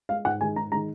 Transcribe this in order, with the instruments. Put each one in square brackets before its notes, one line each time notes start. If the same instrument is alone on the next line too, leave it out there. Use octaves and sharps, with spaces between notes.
[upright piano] G#3 F5
G#2 F#5
D#3 G#3 G#5
G#2 A#5
D#3 G#3 A#5